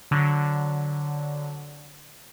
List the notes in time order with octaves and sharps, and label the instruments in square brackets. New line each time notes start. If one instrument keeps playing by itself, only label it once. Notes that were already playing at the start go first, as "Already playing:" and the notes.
[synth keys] D3 F#3